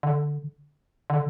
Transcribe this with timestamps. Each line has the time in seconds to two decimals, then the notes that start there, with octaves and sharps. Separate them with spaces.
0.03 D3
1.10 D3